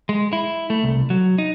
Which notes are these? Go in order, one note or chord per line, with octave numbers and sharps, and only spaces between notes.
G#3
E4
A3
C2
F#3
D#4